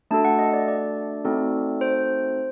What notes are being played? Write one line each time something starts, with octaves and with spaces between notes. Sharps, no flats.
A3 D4 F#4 A4 A5
F#5
D#5
D5
D5
A3 C4 D#4 F#4 A4
C5